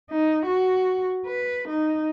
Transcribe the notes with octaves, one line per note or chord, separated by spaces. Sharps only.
D#4
F#4
B4
D#4